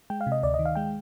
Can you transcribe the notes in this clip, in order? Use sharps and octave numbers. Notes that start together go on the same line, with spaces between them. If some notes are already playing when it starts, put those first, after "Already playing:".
G#3 G5
F5
C3
D#5
D2 D5
D#5
D#3
F5
G#3 G5